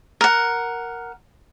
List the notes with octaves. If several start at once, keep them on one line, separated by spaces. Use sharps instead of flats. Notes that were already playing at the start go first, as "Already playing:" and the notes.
A#4 F#5